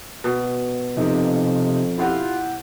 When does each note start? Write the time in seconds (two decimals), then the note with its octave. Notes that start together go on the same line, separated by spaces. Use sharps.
0.24 B2
0.97 F2 C3 D#4
1.98 E4 F4 G4 F#5